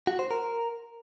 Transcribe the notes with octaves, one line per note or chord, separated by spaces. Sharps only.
F#4
C5
A#4